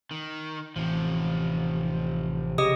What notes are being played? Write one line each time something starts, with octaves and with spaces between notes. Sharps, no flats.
D#3
A1 C3 F3
C#3 G4 D#5 D#6